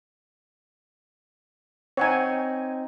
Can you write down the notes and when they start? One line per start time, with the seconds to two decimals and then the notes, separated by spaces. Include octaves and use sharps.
1.97 C4 D#4 C#5 F#5 G#5